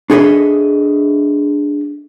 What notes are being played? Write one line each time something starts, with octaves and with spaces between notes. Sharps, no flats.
D4 G#4 A4 C5 D#5 E5